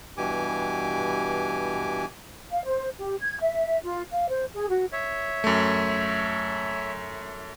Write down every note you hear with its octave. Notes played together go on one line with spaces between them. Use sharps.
G2 B2 E3 G4 G#5 D6
F5
C5
G4
G#6
E5
F4
F5
C5
G#4
F#4
C#5 E5
F#2 A3